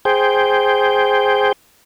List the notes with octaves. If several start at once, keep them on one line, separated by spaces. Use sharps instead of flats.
G#4 C5 G5